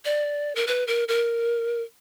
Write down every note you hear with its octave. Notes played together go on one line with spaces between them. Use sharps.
D5
A#4
B4
A#4
A#4